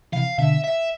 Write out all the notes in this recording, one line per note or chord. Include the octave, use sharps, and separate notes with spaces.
C3 E3 F5
B2 D3 E5
E5